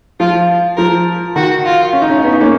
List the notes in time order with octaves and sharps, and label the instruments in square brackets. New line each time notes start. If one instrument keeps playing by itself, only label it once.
[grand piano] F3 [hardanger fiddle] F4
[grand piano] F3 [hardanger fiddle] A#4
[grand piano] D#3 [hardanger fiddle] F#4
[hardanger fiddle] F4
[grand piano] C#4
D#4
C#4
D#4
[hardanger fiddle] B3 [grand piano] C#4
[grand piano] D#4
A#3 C#4